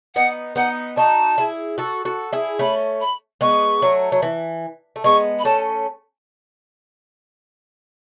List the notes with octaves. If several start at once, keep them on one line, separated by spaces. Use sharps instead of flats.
B3 D#4 F#5
B3 D#4 F#5
D#4 F#4 A5
E4 G#4
F#4 A4
F#4 A4
E4 G#4
A3 C#4 B5
B5
G#3 B3 C#6
F#3 A3
F#3
E3
A3
G#3 B3 C#6
B5
A3 C#4 A5